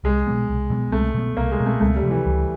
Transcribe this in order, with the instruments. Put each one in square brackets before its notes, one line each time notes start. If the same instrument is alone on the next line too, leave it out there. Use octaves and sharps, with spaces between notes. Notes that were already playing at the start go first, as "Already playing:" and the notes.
[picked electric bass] C2 [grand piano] G#3
[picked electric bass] B2 F#3 B3
C2
B2 F#3 B3
[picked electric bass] C2 [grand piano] A3
[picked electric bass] B2 F#3 B3
[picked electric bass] C2 [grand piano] A#3
[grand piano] G#3
[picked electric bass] B2 F#3 B3
[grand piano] A3
[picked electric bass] C#2 [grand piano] A3
[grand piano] G3
[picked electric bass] C3 F3
[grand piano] E3
[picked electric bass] C#2